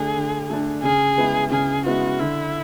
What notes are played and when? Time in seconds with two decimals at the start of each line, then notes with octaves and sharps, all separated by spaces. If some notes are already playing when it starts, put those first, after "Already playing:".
Already playing: D3 A3 D4 G#4
0.16 D3
0.50 A3 D4
0.83 C#3 G#4
1.17 G#3 B3 E4
1.51 C#3 G#4
1.85 G#3 B3 E4 F#4
2.20 D3 E4